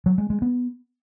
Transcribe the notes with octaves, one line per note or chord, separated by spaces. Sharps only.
F#3
G#3
G#3
B3